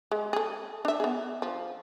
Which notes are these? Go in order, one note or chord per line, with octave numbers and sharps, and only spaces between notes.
G#3
G#4 A4
D4 E5
B3 G#4
F3